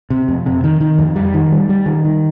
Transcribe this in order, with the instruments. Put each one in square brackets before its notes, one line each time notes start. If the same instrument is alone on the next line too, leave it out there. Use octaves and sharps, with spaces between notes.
[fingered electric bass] C3
F2
C3
D#3
D#3
F2
G3
D#3
G3
G3
D#3
D#3